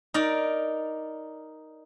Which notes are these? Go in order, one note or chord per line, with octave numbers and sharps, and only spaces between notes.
D#4 A#4 D5